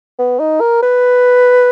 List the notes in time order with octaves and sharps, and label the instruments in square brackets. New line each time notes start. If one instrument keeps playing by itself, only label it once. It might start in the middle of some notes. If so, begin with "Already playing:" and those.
[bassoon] B3
D#4
A#4
B4